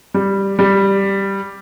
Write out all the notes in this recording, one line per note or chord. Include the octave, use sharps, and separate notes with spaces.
G3
G3